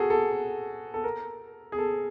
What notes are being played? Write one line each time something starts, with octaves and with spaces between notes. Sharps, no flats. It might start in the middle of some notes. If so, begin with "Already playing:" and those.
Already playing: F#4 G#4 A4
A4
A4
A#4
G#4
A4